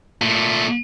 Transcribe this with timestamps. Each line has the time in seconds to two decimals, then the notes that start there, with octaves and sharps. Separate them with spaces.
0.22 A#2 A3